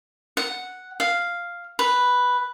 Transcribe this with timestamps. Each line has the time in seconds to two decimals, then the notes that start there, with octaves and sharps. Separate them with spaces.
0.37 F#5
1.00 F5
1.79 B4